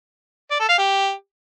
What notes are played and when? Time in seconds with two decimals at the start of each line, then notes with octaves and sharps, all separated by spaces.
0.51 D5
0.60 A4
0.69 F5
0.78 G4